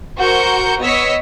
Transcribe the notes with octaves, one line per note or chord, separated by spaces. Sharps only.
F#4 A#4 C5 A#5 G6 C#7
B3 C#5 D#5 E6 B6 C#7